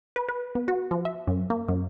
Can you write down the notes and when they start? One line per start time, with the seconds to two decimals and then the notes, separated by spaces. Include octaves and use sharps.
0.16 B4
0.29 B4
0.55 B3
0.68 F#4
0.91 F3
1.05 E5
1.27 F#2
1.50 A#3
1.69 F#2